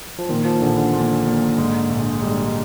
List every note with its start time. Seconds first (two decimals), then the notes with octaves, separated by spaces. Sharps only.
0.19 F3
0.29 A#2 D#3
0.45 F3
0.62 A#1 D3
0.77 D3
0.93 A#2
1.26 A#2
1.58 G#2
1.90 A#1
2.22 G3 G#3